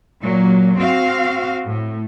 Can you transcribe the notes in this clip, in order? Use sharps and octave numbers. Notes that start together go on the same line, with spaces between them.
A#2 F#3
C4 F#4 F5
A2